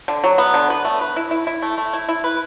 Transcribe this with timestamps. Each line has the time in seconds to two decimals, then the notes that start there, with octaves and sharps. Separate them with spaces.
0.08 D3
0.24 F#3
0.38 B3
0.54 D3
0.70 B4
0.85 A3
1.01 B4
1.16 E4
1.31 E4
1.47 E4
1.62 A3
1.78 A3
1.93 E4
2.09 E4
2.24 B4